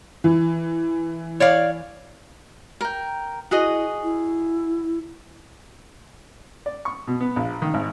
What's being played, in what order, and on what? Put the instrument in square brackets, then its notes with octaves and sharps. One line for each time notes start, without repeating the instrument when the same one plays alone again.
[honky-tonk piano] E3
[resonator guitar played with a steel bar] C#5 D5 F5
[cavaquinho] A#4 G5
[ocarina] E4 [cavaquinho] F#4 G#4 D#5
[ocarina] E4
[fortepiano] D5
C#6
B2
B3
A#1
D#3
G#1